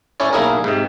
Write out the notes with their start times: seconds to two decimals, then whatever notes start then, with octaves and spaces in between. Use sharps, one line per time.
0.20 C#4 E4 C#5 D5
0.33 B1 A#3 E4 G#4 A#4
0.64 G#2 C3